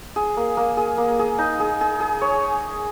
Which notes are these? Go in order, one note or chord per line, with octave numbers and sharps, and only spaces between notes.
G#4
A#3
A#3
G#4
A#3
G#4
D#4
G#4
G#4
G#4
C#5